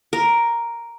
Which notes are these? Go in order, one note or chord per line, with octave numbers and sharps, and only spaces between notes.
A#4